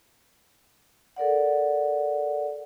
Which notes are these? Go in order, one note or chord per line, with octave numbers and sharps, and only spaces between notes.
A4 A#4 D5 F#5